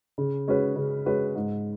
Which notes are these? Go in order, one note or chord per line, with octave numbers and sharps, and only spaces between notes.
C#3
G#3 C#4 F#4 B4
C#3
G#3 C#4 F#4 B4
G#2